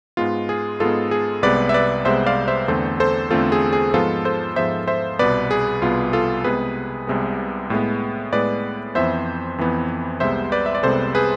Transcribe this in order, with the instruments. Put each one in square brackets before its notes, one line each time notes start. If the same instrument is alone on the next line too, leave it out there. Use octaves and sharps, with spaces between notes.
[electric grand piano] G#2 G#3 B3 F4
G#4
G#2 G#3 B3 F4 A4
G#4
C2 C3 G#3 B3 B4 D5
E5
B4 D5
C2 C3 G#3 B3 C5 E5
D5 F5
C5 E5
E2 D3 A3 C4 A4 C5
A4 C5
E2 D3 A3 C4 F4 A4
G#4
G#4
G#2 F3 G#3 B3 F4 A4
A4 C5
G#2 F3 G#3 B3 C5 E5
C5 E5
C2 B2 B3 B4 D5
G#4
C2 B2 B3 F4
F4 A4
C2 C3 G#3 B3 G#4 B4
C2 C3 G#3 B3
A2 G#3 B3
A2 G#3 B3 B4 D5
F2 E3 B3 C5 E5
F2 E3 B3
C2 C3 G#3 B3 C5 E5
B4 D5
E5
D5
C2 C3 G#3 B3 A4 C5
G#4 B4